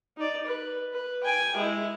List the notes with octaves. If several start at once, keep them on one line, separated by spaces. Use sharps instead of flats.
D#4 D5
B4
B4
G5 G#5
G#3 E4